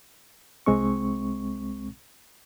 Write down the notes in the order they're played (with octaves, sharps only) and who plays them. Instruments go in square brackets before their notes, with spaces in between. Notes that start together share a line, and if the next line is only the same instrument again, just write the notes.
[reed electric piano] C2 G#3 C4 C#6